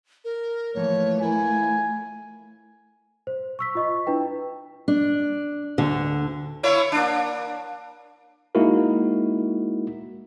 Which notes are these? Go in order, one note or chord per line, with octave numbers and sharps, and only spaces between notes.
A#4
E3 F3 A3 A#3 C#5
E4 F4 A#4 G#5
C5
C#6 E6 B6
F4 D#5 C#6
D4 E4 B4 G5
D4
D2 D3
A#3 E4 C#5
A#3 D4
G#3 A#3 D#4 E4 F#4 A#4